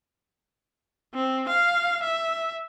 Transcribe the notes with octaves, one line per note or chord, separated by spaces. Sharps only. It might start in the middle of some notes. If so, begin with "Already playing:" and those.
C4
F5
E5